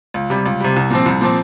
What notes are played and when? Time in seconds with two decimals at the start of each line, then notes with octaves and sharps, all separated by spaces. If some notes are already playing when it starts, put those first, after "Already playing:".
0.14 C#2
0.30 C3 G3
0.46 C#2
0.60 C3 G3
0.76 C2
0.90 A#2 F3 C4
1.06 C2
1.21 A#2 F3 C4